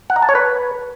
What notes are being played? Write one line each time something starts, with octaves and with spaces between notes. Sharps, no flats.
F#5
A#5
A5
C#5
B4